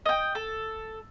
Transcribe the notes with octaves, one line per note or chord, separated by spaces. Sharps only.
D#5 G5
A4